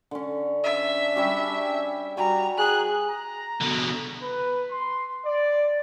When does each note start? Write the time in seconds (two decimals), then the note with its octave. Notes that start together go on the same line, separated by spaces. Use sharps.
0.11 D3 C#4
0.64 D4 E5
1.16 G3 C#4 G4
2.17 G3 F#4 G#5 A#5
2.58 G#4 F#6
3.09 A#5
3.60 B2 D3
4.22 B4
4.70 C6
5.26 D5